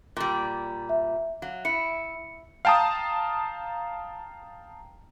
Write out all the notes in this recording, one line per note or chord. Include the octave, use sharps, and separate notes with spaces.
A#2 G3
E5
F#3 F5
E4 C#7
F5 G5 A5 A#5 D#6